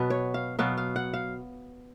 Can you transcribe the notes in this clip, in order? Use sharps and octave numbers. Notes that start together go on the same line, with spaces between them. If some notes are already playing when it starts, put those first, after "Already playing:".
Already playing: B2 F#3 B3 B4
C#5
F5
B2 F#3 B3 F5
F5
F#5
F5